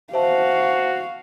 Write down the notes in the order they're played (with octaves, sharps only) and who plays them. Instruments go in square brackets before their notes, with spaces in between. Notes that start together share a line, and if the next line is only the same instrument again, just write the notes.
[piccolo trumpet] F#4 [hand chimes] C5 E5 A5 [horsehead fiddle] F5